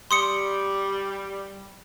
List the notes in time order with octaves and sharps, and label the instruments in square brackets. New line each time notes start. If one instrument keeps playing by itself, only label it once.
[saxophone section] G3 [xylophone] C6 D#6 C#7